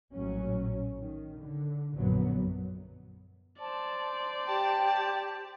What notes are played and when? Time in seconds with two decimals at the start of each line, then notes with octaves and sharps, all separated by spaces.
0.13 A#1 A2 F#3 C#4
1.02 D#3
1.40 D3
1.96 A#1 F#2 D3 F#3 B3
3.60 C5 D5 A5
4.48 G4 G5 A5